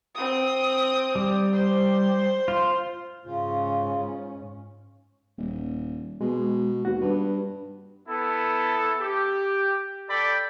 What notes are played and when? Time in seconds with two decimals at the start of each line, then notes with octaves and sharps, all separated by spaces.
0.15 C4 D#6
1.15 G3
1.53 C5
2.48 F4
3.26 G#2 C#3 C#4 F4
5.38 D#1
6.21 B2 G#3
6.85 D#2 F#4
7.02 G2 B4
8.08 B3 E4 A4
9.00 G4
10.09 A4 D5 G5 B5